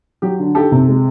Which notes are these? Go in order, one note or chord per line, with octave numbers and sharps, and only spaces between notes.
F#3 G4
D3
D#3 G4 A4
C3
G#3